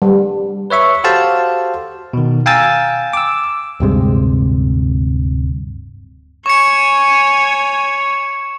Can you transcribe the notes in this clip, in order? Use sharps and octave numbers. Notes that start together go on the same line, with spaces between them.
G3
B4 C#5 E5 C#6
F#4 G4 A4 C5 F5 A5
B2 D#3
F5 G5 G#5 A#5 E6 A6
D6 E6
D1 G2 C3 G#3
C#5 G#5 C#6 C#7